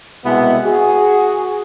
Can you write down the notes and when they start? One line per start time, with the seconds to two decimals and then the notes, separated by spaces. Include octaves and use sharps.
0.25 C2 B2 G#3 B3 E4
0.65 F#4 G#4